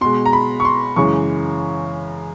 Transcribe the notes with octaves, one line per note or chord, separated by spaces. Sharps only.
B2 G#3 C6
A#5
B5
C#6
C6
F#2 C#3 E3 G#3 C#6